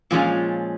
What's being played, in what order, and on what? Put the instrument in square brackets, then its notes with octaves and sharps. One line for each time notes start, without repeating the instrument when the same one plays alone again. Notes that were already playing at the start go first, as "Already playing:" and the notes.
[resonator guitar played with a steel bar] A#2 F3 G#3 C#4 F4